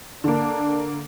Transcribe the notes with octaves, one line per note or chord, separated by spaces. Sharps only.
D3 A#3 D4